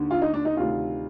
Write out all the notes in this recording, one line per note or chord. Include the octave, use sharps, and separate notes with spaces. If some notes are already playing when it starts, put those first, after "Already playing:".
Already playing: D#2 D3
F4
D#4
D4
D#4
D2 C3 D#3 F4